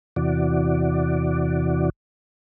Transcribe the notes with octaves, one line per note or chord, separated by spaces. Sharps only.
E2 C3 E3 F#4 D5